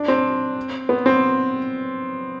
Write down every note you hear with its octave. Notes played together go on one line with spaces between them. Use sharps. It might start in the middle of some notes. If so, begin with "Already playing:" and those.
Already playing: D4
C4
B3
C4